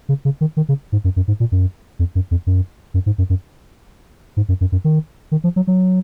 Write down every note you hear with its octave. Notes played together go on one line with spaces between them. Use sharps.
C#3
C#3
D#3
D#3
C#3
G#2
F#2
F#2
G#2
A#2
F#2
F2
F#2
F2
F#2
F#2
G#2
F#2
F#2
G#2
F#2
F#2
F#2
D#3
D#3
F3
F#3
F#3